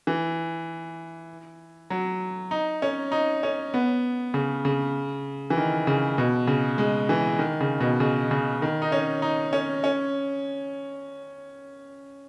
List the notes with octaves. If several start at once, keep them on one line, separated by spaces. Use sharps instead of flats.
E3
F#3
D#4
C#4
D#4
C#4
B3
C#3
C#3
E3
D#3
C#3
B2
C#3
G#3
E3
D#3
C#3
B2
C#3
C#3
D#3
D#4
C#4
D#4
C#4
C#4